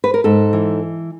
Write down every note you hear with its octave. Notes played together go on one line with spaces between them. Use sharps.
B4
A#4
G#2 A4
E3